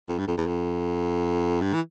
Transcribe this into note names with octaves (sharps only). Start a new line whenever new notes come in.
F2
G2
F2
E2
F2
G2
E3